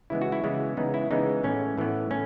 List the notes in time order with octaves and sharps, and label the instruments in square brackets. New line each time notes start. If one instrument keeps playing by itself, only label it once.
[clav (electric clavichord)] C#3 E3 G#3 B3 E4
F#4
E4
C#3 E3 G#3 B3
C#3 E3 G#3 B3 D#4
E4
C#3 E3 G#3 B3 D#4
A2 E3 B3 C#4
A2 E3 B3
A2 C#4